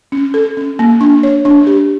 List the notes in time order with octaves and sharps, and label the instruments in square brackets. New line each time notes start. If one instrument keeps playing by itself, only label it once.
[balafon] C#4
A4
C#4
A#3
D4
C#5
D4
G4